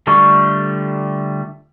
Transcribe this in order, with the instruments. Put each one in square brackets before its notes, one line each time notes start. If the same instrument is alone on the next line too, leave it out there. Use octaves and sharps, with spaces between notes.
[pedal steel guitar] D3 G3 A3 F4 C#6